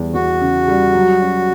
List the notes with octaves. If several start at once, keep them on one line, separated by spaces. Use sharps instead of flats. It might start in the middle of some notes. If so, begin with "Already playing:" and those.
Already playing: E2 G3
E2 F#4
C#3
G3
F#3
C#4